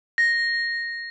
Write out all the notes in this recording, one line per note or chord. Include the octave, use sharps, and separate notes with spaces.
A#6